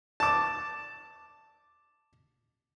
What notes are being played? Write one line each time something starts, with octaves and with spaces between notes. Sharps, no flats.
A5 D6